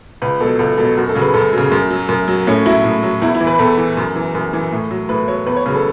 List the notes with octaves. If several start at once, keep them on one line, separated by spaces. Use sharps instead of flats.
C#2 B4
B2 F#3 A4
C#2 A4
B2 F#3 A4
F#2 F#4
A4
C#3 F#3
B4
F#2 A4
C#3 F#3
F#2
F#3
F#2
F#3
A2 C#4
F#3 E4
A2
F#3
E2 E4
E4
E3
B4
E2 A4
E3
F#2
E3
F#2
E3
A2
F#3
A2 B4
F#3 C#5
E2 B4
C#5
C#3 F#3 B4
A4